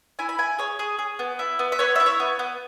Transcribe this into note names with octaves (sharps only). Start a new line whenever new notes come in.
E4 G#5
B5
E4 G#5
G#4 C#5
G#4
G#4
B3
E4
B3
E5
B3 C#5
E4 E5
C#5
B3
B3